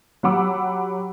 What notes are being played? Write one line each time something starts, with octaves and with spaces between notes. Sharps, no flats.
F#3 G4 F#5 B5 D6 E6